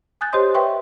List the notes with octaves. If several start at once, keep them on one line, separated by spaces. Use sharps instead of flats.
G#5 D#6 F#6 G6 A6
G4 C5 C#5 D#5 C6 D#6
B4 C#5 E5 G5 C6 C#6